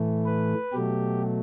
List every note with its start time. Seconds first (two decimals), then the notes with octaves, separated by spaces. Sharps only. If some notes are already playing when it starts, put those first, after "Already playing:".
Already playing: A2 E3 A3
0.25 B4
0.73 B2 F#3 A3 G4